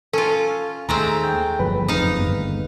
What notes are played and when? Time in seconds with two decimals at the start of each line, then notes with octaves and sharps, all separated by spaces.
0.13 C#4 F4 A4
0.89 D#2 G#3 A3 C4 A#5
1.23 G5
1.60 G1 F3 F#3 B4
1.88 F#1 F2 C4 D#4 F5
2.17 G1 D#2 D3